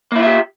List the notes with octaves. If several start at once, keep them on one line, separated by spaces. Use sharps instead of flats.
A#3 E4 F4 G4 E5